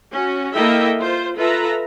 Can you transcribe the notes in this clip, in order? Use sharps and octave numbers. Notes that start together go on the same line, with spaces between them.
C#4 F#4
A#3 E4 A4 D#5 E5 G5
F4 C5
F4 A4 B4 E5 A#5